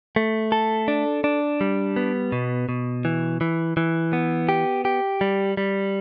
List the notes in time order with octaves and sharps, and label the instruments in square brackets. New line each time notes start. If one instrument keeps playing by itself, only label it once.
[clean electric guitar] A3
A4
D4
D4
G3
B3
B2
B2
E3
E3
E3
B3
G4
G4
G3
G3